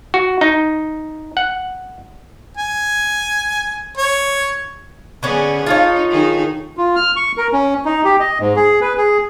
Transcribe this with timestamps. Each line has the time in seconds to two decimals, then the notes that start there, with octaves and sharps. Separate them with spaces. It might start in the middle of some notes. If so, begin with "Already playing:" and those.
0.14 F#4
0.41 D#4
1.37 F#5
2.57 G#5
3.98 C#5
5.23 D3 B3 C#4 G#4
5.66 D#4 F4 A4 C#5
6.11 D#3 D#4 G#4
6.77 F4
6.96 F6
7.16 C#6
7.37 A#4
7.53 C#4
7.85 D#4
8.05 G4
8.20 D#5
8.40 G#2
8.56 G#4
8.81 B4
8.98 G#4